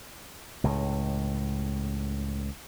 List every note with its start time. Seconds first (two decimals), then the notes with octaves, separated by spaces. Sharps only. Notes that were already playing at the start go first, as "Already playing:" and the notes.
0.64 C#2 A2